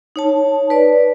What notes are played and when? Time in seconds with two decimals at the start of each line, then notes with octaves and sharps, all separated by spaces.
0.16 D#4 C#5 A5
0.70 B4 D5